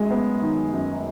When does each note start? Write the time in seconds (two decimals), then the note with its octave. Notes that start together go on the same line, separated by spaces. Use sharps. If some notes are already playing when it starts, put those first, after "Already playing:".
Already playing: F#2 G#3
0.11 B3
0.42 D#3
0.73 F#2